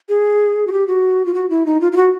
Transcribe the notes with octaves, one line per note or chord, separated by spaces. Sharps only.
G#4
F#4
G4
F#4
F4
F#4
E4
D#4
F4
F4
F#4